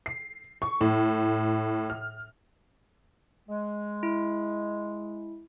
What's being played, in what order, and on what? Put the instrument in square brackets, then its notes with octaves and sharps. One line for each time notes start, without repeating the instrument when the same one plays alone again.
[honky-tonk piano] C7
C#6
A2
F6
[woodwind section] G#3
[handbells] E4